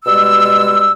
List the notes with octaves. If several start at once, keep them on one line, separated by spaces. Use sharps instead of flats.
B2 G3 G#3 E6